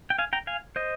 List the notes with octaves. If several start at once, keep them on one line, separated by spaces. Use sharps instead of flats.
G5
F5 G#5
G5 A#5
F5 G#5
C5 D#5